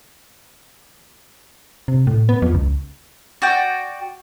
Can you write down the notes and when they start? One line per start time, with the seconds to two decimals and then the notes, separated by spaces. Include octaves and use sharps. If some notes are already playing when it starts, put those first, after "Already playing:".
1.88 C3
2.07 A2
2.29 B3
2.42 F2
2.54 C#2
3.42 F#4 D5 G5